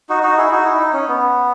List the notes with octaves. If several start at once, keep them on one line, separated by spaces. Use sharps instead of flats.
D#4 F#4
D#4 F#4
E4 G#4
D#4 F#4
E4
D#4
C#4
B3